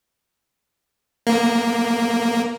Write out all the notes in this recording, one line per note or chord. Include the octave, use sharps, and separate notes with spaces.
A#3